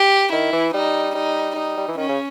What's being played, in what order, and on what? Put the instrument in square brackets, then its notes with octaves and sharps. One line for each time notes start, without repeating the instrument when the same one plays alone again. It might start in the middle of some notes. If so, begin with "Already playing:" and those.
Already playing: [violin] G4
[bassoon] D#3 [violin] E4
[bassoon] E3
[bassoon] G3 [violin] D#4
[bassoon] G3 [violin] D#4
[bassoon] G3 [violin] D#4
[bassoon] G3
E3
[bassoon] D#3 [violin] C#4
[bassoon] C#3